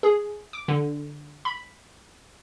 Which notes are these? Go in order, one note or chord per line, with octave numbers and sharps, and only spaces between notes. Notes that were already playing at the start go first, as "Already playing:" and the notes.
G#4
D6
D3
B5